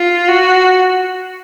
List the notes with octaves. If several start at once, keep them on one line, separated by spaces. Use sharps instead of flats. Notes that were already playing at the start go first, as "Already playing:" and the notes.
Already playing: F4
F#4